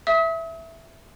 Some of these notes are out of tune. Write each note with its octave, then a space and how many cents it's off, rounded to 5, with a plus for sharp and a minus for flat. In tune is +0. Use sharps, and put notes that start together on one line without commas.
E5 +0 D#6 +45